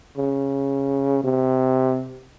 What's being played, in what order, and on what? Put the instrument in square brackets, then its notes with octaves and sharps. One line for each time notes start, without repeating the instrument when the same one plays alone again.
[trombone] C#3
C3